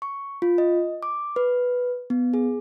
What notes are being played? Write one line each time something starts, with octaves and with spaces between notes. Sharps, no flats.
C#6
F4
D#5
D6
B4
B3
G#4